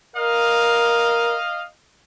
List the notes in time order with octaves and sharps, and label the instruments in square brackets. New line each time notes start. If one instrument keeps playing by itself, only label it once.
[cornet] A#4 [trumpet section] D#5 F5